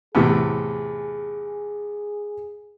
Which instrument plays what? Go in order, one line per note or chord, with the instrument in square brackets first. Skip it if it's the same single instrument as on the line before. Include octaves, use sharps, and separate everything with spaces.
[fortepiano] E2 A2 C3 [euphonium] G#4